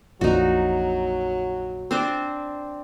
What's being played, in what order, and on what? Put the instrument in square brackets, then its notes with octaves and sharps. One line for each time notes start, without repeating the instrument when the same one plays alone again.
[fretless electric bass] A#1 F2 A#2 [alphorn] F#3 [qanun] D#4 F#4
[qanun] C4 D4 C5